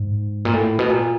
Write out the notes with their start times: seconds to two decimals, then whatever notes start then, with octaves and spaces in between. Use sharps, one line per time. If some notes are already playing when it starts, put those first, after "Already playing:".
Already playing: G#2
0.45 A#2
0.53 A2
0.79 B2
0.89 A#2